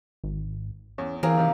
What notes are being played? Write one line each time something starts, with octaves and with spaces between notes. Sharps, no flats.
G#1
E2 C#4
E3 A#3 C4 G#4 A#4
C3 D#3